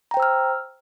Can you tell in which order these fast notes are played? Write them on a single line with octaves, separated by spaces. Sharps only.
A#5 G5 C5 E6 F6